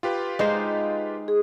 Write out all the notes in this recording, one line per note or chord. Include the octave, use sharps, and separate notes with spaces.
F4 G4 B4
G#3 D#4 C5
G#4